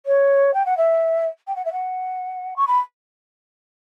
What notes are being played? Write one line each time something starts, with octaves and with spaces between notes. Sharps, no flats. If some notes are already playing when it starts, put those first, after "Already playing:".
C#5
G5
F#5
E5
G5
F#5
E5
F#5
C#6
B5